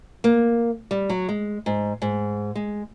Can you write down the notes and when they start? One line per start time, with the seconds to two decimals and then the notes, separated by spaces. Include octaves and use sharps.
0.24 A#3
0.91 G3
1.09 F#3
1.29 G#3
1.66 G#2
2.02 G#2
2.55 G#3